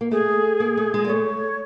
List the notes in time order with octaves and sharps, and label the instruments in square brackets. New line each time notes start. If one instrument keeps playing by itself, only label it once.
[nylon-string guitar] A#3
[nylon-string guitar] A3 [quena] G#4
[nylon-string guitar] A#3
A3
G#3
[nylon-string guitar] A#3 [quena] D5
[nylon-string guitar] A3 [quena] C#5